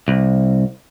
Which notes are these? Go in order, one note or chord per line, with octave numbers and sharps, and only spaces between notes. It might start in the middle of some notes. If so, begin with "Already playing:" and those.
C2